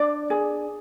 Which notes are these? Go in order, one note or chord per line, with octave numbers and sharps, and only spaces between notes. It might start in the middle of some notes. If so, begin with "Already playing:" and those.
Already playing: D4 D5
G#4